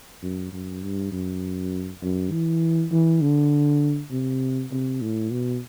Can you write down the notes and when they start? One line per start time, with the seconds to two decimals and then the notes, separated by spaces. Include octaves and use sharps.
0.22 F#2
0.52 F#2
0.83 G2
1.12 F#2
2.02 F#2
2.32 E3
2.91 E3
3.21 D3
4.11 C3
4.72 C3
5.02 A2
5.32 B2